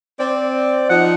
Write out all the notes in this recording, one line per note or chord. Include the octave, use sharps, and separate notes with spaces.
C4 D5
F3 D#4 F#5